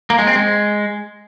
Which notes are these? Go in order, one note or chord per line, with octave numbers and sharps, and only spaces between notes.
A#3
G#3
C4
G#3